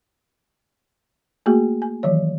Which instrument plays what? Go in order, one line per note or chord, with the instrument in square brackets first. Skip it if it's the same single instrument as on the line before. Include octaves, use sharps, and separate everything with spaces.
[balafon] A3 A#3 F#4 G#4
G#5
D#3 E3 F#3 C#5